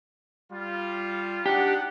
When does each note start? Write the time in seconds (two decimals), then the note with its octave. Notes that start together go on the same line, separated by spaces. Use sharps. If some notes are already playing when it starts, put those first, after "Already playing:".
0.52 G3 F4
1.46 D4 D#4 G4 F#5